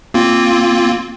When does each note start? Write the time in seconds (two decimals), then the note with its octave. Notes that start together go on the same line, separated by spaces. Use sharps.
0.14 A#3 C4 F4